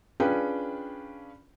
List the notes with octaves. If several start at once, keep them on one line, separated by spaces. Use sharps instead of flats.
C#4 D4 F4 G#4 B4 G5